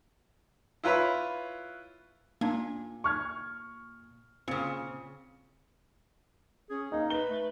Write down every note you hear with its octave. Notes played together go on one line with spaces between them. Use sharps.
E4 F4 B4 C#5 B5
A#2 A#3 D4 D#4
C#6 F6 G#6
A#2 C#3 C4 C#7
C#4 G#4
A#3 D#4 D#5
B4 G7
A3